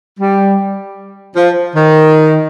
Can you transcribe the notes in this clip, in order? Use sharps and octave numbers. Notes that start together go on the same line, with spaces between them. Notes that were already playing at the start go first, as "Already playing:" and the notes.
G3
F3
D#3